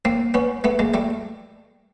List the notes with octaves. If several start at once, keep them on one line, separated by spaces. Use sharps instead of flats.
A#3 C4
B3 C#4
A3 B3
G#3 A#3
G3 A3